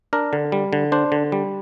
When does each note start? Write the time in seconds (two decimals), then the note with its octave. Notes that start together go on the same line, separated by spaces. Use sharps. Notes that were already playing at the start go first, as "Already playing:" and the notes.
0.13 D4 A#4
0.33 D3
0.52 G3
0.73 D3
0.92 D4 C5
1.12 D3
1.32 G3